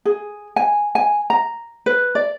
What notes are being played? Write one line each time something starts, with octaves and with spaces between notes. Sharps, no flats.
G#4
G#5
G#5
A#5
B4
D5